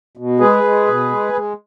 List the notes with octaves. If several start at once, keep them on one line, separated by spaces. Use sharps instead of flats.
B2
G#3 G#4 B4
G#3
B2
G#3
G#3